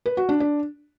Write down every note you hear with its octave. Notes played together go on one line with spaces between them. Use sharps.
B4
F#4
D4
D4